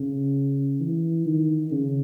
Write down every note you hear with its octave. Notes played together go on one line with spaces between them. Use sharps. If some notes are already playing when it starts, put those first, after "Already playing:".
Already playing: C#3
E3
D#3
C#3